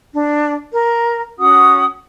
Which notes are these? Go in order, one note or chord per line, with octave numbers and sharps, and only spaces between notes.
D4
A#4
C#4 F#4 F#5 D#6